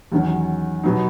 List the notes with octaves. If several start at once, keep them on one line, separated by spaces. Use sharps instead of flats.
E2 D#3 F#3 C#4
B2 F#3 B3 D#4